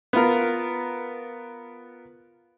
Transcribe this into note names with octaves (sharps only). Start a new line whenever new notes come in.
B3 F4 A#4